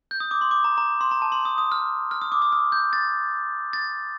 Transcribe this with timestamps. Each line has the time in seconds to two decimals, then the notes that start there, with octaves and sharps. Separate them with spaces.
0.11 G6
0.20 D#6
0.31 D6
0.41 C6
0.51 D6
0.64 A#5
0.78 A#5
1.01 C6
1.11 A#5
1.22 A5
1.32 C6
1.45 D#6
1.58 D#6
1.72 F6
2.11 F6
2.22 D#6
2.32 D6
2.42 D#6
2.52 F6
2.72 G6
2.93 A6
3.73 A6